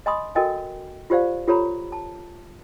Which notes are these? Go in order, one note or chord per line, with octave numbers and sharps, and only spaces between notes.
D#5 G#5 B5 C6 D#6
F#4 A4 A#4 D#5 G5 G#5
F4 G4 C5 D5 F5
F4 G4 A4 C#5 A#5 B5
A5